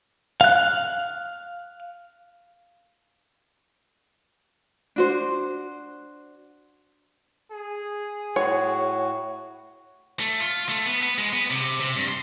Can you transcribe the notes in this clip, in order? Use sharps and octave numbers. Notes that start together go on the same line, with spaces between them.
F5 F#6
D4 F#4 C5
G#4
A2 F#4 C#5
A3
F4
A3
B3
B3
G#3
B3
C3
C3
G2
C6